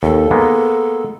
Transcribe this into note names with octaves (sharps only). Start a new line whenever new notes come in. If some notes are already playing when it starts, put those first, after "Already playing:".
D#2 A4
G#3 A#3 B3